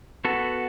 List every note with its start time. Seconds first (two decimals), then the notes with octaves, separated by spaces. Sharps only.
0.25 B3 F#4 A4